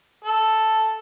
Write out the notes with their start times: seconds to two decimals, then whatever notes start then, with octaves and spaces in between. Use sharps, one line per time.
0.25 A4